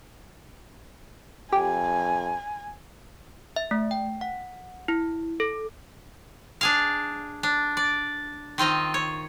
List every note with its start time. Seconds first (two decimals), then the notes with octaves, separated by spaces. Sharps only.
1.52 F2 G4 G#5
3.56 E5
3.71 A3
3.91 G5
4.21 F#5
4.88 E4
5.40 A4
6.61 D4 G#4 F5
7.43 D4
7.77 D5
8.58 D#3 C4 F4 D#5
8.94 C#5